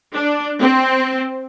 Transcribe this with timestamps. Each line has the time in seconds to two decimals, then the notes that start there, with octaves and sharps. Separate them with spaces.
0.14 D4
0.60 C4